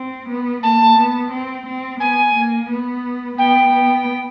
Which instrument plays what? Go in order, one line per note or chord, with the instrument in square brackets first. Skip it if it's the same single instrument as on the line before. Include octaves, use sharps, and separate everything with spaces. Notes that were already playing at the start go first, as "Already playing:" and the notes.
Already playing: [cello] C4
B3
[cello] A#3 [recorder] A5
[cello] B3
C4
C4
[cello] B3 [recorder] G#5
[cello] A#3
B3
[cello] B3 [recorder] G5
[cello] B3